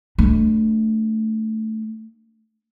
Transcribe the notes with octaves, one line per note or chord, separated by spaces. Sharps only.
A3 D4